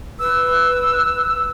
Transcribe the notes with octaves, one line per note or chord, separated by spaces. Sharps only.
B4 E6